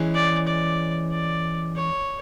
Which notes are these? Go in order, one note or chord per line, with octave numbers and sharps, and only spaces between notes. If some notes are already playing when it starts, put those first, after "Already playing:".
Already playing: E3 G#3 C#4
D5
D5
D5
C#5